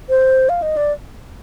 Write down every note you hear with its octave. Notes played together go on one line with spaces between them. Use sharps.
C5
F5
D#5
D5